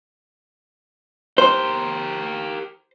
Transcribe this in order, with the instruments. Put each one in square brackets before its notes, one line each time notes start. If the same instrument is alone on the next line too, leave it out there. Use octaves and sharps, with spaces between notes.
[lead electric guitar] G4 A#4 [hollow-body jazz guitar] C5